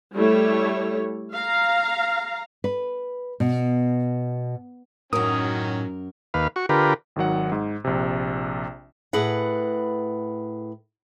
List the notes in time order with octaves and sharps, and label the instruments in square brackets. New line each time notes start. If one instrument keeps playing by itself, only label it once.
[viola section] G3 A3 E4 C#5
F5 A#5
[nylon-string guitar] B4
B2
[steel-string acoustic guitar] F#2 A#4 [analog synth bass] A2 [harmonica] D#3 F#3 C#4 [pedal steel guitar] D#6
[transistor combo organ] D#2 B4 F5
F#4 C#6
D3 F4 G4 A#4 B4
[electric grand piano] G#1 D#3 F#3 F#5
G#2
A#1 C3
[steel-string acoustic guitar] A2 G#4 B4 F#5